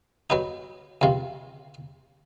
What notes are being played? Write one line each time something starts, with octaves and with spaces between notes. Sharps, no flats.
F#3 B3 D#4
C#2 C3 F3